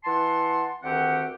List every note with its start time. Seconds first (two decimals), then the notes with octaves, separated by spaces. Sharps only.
0.04 E3 F#5 A5 C6
0.83 D2 D#3 C4 G4 F#5